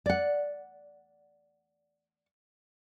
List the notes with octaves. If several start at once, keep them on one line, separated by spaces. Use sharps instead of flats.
D5 F#5